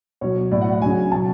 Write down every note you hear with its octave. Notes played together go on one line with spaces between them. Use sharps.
B2 F#3 C#5
A2 F#3 D5
F#5
F#5
C#3 F#3 G#5
B2 F#3 A5